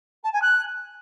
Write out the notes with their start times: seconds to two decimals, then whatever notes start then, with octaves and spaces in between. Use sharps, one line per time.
0.23 A5
0.33 G#5
0.42 F#6